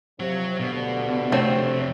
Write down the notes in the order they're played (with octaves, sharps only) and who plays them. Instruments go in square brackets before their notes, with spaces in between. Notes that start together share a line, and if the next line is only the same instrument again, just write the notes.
[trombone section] C3 F3 [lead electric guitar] F#3 F#4
[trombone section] D2 G2 D3 [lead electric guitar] B2
[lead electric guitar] F2 C3 [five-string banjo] A3 C4 C#5